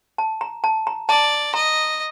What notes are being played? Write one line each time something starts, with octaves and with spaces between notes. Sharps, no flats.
A5
A#5
A5
A#5
D5 A5
D#5 A#5